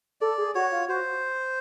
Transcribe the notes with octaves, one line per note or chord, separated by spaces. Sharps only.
A4 D5
G#4
F#4 C#5
F4
F#4 C5